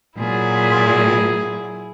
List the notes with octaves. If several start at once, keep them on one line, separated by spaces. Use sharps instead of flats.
A#2 F#3 E4 G#4